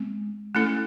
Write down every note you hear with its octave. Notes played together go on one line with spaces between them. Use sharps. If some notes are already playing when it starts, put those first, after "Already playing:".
Already playing: G#3 C4
A3 C#4 E4 A4